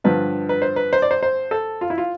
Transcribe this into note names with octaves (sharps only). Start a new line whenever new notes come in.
G2 D3 F3 B4
B4
C5
B4
C5
D5
C5
C5
A4
F4
E4
F4